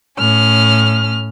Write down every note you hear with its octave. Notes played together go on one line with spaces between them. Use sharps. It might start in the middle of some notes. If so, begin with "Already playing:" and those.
A2 C#4 F6